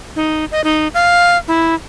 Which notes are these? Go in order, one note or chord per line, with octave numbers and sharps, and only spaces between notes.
D#4
D#5
D#4
F5
E4